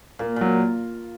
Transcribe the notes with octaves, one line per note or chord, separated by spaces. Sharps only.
A#2 A#3
A#2 F#3